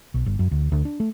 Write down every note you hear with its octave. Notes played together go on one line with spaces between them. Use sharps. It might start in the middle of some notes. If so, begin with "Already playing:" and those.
B1
G1
F#2
D2
D2
D4
A3